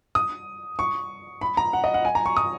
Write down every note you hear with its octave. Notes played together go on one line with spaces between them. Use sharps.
D#6
C#6
B5
A#5
F#5
D#5
F#5
G#5
A#5
C#6
D#6